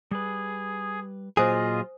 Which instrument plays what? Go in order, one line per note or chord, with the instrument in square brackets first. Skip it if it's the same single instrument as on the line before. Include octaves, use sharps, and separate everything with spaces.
[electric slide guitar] G3 B4 [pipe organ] G#4
[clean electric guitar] A#2 G#4 [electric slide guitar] F#3 [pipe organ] F4 D#5 [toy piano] C5 G#5 D#6